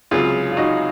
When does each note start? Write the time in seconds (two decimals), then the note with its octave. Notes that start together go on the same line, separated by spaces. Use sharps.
0.11 C#2 C3 F#3 F4 G#4
0.51 F4
0.57 D#4 F#4